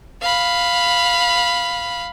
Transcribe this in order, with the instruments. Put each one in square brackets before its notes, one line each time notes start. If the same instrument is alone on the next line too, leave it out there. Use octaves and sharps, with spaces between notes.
[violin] F5 B5